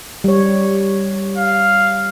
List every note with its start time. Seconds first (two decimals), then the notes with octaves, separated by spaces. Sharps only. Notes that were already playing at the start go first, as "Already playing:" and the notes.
0.24 G3 C#5
1.38 F5